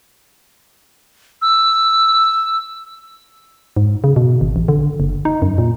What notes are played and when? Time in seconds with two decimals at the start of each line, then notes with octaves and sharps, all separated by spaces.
1.42 E6
3.77 G#2
4.04 C#3
4.16 B2
4.41 G#1
4.56 A1
4.68 D3
5.00 F#1
5.25 D#4
5.42 F#2
5.58 A#2